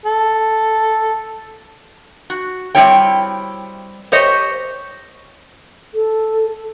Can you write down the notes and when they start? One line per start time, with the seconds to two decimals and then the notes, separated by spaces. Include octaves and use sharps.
0.06 A4
2.30 F#4
2.75 G3 C4 E4 C#5 G5
4.12 G4 C5 C#5 D#5
5.94 A4